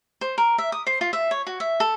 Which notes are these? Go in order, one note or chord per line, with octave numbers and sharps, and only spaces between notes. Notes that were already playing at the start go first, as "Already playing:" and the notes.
C5
A#4
E5
D#6
C5
F4
E5
C#5
F#4
E5
A4